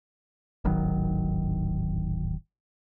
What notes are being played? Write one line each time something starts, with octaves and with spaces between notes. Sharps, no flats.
D1 G#1 D#3 F#3